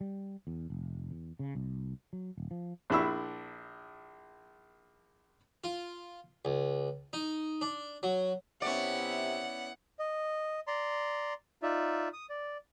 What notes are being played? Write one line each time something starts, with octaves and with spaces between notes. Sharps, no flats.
G3
E2
F1
E2
C#3
C2
F#3
D#1
F3
A#1 D4 E4 B5 C#6 E6
F4
C#2
D#4
D4
F#3
C3 B3 C#4 E4 D5 F#5
D#5
D5 A#5 C6
D#4 F4 D5 E5
D#6
D5